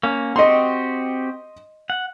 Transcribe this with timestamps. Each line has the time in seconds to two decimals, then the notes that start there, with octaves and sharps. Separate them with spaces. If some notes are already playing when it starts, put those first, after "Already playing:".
0.03 A#3 C#4
0.36 C4 F#4 G4 D#5 C6
1.90 F#5